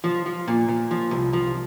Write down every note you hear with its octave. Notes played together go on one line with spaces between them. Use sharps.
F3
F3
A#2
A#2
F3
C2
F3